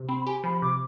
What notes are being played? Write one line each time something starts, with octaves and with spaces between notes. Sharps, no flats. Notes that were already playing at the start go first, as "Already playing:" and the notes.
Already playing: C3
C4 B5
G4 G#5
F3 B5
C3 D6